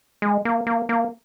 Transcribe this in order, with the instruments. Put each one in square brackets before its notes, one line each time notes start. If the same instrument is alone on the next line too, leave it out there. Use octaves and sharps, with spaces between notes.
[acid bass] G#3
A#3
A#3
A#3